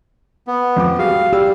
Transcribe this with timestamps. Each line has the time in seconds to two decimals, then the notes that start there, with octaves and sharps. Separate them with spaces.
0.47 B3
0.76 F2 D6
0.99 G3 F#4 G#4 F5
1.33 G3 G4 E6